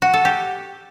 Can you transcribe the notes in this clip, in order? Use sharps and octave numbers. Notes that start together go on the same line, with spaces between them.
F#4
A4
G4